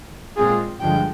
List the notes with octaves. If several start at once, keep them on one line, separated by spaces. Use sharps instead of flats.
A#2 G#3 C4 F4 G#4
G2 D3 F3 G#3 G5